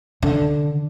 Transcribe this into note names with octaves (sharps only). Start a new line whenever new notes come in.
D3